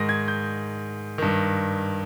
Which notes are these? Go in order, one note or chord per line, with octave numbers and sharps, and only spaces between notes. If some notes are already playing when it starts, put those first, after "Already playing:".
Already playing: G#2 D#3 A#6
G#6
G6
G2 D#3